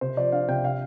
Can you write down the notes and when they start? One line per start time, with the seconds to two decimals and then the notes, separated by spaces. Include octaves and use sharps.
0.01 C3 C5
0.17 F3 D5
0.32 D4 F5
0.48 C3 G5
0.64 F5